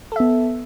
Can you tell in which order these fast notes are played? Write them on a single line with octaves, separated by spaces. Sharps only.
A4 E5 B3